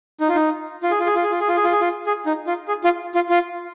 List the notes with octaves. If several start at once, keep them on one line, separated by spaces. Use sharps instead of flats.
D#4
F4
D#4
F4
G#4
F4
G#4
F4
G#4
F4
G#4
F4
G#4
F4
G#4
F4
G#4
D#4
F4
G#4
F4
F4
F4